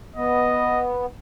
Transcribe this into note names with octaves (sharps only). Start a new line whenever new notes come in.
B3 D#5